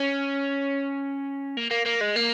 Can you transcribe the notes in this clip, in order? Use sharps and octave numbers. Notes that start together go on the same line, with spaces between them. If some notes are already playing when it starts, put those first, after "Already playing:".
Already playing: C#4
A#3
A#3
A#3
G#3
A#3